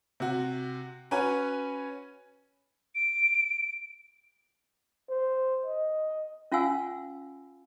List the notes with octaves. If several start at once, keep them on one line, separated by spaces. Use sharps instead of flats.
C3 F#4
C#4 F#4 B4 C#5 G#5
D7
C5
D#5
C#4 F4 F5 F#5 G#5 E6